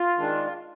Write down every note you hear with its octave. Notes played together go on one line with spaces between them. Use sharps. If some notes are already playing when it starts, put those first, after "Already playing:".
Already playing: F4
D#3 G#3 D4